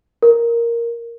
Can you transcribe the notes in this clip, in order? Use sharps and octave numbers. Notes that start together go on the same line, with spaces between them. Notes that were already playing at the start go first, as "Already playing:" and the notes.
A#4